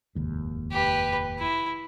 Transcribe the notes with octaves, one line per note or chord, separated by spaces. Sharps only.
F1 D#2 G#2
G4 B4
E4